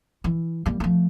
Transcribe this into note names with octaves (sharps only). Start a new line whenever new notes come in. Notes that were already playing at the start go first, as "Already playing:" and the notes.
E3
G3 A#3
F3 A3